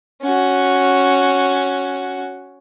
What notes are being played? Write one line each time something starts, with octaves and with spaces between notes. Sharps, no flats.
C#4 F#4